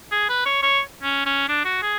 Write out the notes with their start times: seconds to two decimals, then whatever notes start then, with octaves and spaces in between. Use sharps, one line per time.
0.12 G#4
0.29 B4
0.46 C#5
0.62 C#5
1.02 C#4
1.26 C#4
1.49 D4
1.65 F#4
1.82 G#4